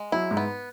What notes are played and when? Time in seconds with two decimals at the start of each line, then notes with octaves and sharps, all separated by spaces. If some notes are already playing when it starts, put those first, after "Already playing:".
Already playing: G#3
0.12 F#3 E4
0.31 G#2
0.37 B3